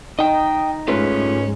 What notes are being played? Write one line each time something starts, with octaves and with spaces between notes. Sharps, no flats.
D#4 D#5 G5
G#2 G#3 A3 C#4 F4 B4